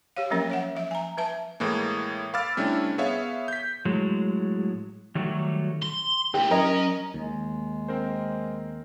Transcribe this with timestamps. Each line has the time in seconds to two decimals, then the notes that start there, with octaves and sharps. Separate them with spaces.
0.16 G4 C#5 F5
0.30 F3 F#3 A#3 C#4 A#4
0.50 C#5 E5 F#5
0.75 F3 E5
0.91 G#5 A#5
1.17 B4 E5 A5
1.60 A2 E3 G#3 A#3
2.34 F5 B5 D6 E6 F6 A6
2.57 C3 G3 A3 C#4 D4 E4
2.98 B3 G#4 C#5 E5 F5
3.48 G6 B6
3.85 A2 F#3 G#3
5.15 D#3 F#3 G3 A3 F#4
5.82 C6
6.34 D#2 A2 G4
6.51 F#3 C#4 A#4 D#5
7.14 D#2 G#3
7.88 C4 A#4 C5